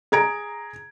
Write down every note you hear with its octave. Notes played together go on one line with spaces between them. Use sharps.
G#4 A#5 G#6 D7